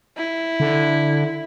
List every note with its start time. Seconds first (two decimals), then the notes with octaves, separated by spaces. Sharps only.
0.17 E4
0.60 D3